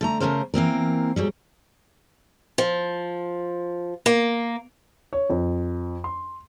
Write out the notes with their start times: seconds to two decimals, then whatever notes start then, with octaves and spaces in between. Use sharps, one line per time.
0.01 D3 A3 A#5
0.20 C#3 F3 A3 C#4 A#4 C5
0.54 E3 A#3 C4 A#4
1.16 G#2 F#3 G3
2.58 F3
4.06 A#3
5.13 C#5
5.30 F2
6.04 C6